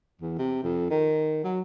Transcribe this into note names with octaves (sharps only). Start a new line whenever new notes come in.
E2
C3
F2
D#3
F#3